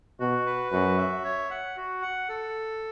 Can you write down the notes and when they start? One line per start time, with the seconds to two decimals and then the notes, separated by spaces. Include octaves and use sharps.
0.20 B2 F#4
0.46 B4
0.72 F#2 F#4
0.98 E5
1.24 C#5
1.50 F#5
1.77 F#4
2.02 F#5
2.29 A4